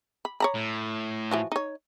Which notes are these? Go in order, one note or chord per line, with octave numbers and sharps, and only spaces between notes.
B5
C#5 A#5 B5
A2
E3 F3 F#4
D#4 C#5